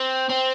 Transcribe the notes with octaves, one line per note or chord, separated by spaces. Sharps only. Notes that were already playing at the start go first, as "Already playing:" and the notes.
Already playing: C4
C4